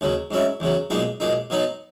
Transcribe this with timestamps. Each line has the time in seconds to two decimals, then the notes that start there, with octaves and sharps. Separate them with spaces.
0.01 D#2 C#3 F#3
0.31 G#2 F#3 C#4 E4
0.60 E2 C#3 F#3
0.90 B1 A#2 G#3 B3 D#4
1.20 B1 A#2 G#3 D#4
1.50 B2 F#3 B3 D#4